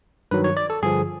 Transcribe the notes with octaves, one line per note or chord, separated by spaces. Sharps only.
G2 D#3 F#3 B4
C#5
D5
A4
G2 D3 F3 G#4